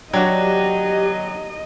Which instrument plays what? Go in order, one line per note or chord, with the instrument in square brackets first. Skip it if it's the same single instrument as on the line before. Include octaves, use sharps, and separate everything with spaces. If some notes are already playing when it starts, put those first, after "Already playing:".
[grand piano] F#3 [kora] D4 F#4 [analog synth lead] G4 [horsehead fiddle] D#5